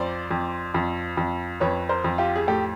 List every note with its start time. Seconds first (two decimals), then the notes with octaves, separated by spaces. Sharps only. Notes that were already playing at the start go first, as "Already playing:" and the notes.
Already playing: F2 C5 D5
0.31 F2
0.74 F2
1.17 F2
1.60 F2 B4 C#5
1.89 A#4 C5
2.04 F2
2.18 F4 G4
2.36 G#4
2.47 A2 G4 A4